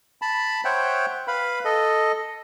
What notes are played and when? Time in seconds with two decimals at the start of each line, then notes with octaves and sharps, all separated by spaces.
0.22 A5 B5
0.65 C5 C#5 E5 F#5 G5
1.28 B4 F5 B5
1.65 A4 D#5